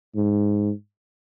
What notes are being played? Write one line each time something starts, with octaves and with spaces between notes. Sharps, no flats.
G#2